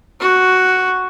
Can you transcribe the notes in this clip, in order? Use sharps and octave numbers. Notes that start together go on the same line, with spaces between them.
F#4